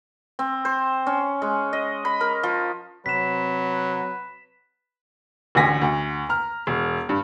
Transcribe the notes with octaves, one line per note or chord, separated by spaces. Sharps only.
C4
C5
C#4
G#3
D#5
B5
A#4
F3
C3 F#3 C4 B4 B6 E7
A1 D2 D3 G#5 A#6 B6
D2
A#5 F6
E1
G2